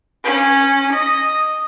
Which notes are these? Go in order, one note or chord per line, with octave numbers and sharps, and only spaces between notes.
C#4
D#5